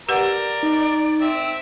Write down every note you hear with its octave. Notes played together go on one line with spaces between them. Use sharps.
G4 A#4 B4 D5 F#5
D#4
C4 E5